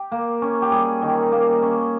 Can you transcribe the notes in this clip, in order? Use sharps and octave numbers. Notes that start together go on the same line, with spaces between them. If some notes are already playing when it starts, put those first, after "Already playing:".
Already playing: G4
A#3
C#4
G4
G3 G#4
D#3
A#3
C#4